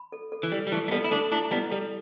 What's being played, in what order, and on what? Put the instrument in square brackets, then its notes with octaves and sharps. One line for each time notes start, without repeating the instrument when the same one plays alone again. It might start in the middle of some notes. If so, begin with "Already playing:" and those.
Already playing: [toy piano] B5
A4
A4
[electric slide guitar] E3
[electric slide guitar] G3 [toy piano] A4
[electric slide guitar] G3
[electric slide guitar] E3 A3 [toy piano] A4
[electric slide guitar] A3
[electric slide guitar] G3 B3 [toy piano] A4
[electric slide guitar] E4
[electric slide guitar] A3 D4 [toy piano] A4
[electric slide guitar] A3 D4 [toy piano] E4
[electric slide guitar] G3 B3 [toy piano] E4
[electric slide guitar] G3 [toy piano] A4